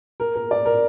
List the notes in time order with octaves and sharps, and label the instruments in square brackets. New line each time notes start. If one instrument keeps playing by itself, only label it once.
[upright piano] A#4
A#4
D5
A#4